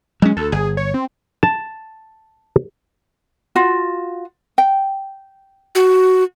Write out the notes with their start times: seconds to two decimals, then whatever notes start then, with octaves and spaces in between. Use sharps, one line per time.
0.22 F#3 G#3 C#4
0.37 D2 A4
0.52 G1 G#4
0.77 C#5
0.94 C4
1.43 A5
3.56 F4 F#4
4.58 G5
5.75 F#4